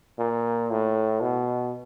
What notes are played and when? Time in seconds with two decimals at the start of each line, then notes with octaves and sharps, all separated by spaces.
0.19 A#2
0.71 A2
1.21 B2